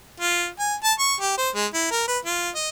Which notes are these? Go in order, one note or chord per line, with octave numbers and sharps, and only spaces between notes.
F4
G#5
A5
C#6
G4
C5
G#3
E4
A#4
B4
F4
D#5